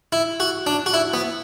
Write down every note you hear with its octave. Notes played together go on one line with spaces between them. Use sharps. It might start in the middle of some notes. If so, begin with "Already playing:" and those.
E4
F#4
D4
F#4
E4
B3